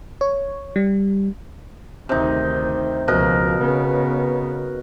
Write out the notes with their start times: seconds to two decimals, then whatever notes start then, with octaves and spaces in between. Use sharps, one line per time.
0.21 C#5
0.76 G3
2.09 D2 C3 D#3 D#4
3.08 C#2 B2 F3 F#4 A#4
3.61 C#3 B3